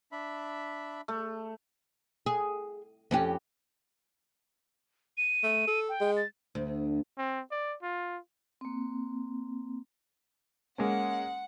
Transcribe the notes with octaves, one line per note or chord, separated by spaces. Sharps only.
D4 E5 B5
A3
G#4
F2 C#4 G4
D#7
A3
A4
G5
G#3
A6
D2
C4
D5
F4
A#3 C4
G#3 A#3 C#4 F#5